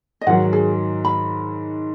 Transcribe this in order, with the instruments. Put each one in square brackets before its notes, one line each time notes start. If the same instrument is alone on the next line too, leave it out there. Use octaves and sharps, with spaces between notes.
[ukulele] D#5
[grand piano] G#2 D#3 F#3 [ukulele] F#5
[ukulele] G#4
B5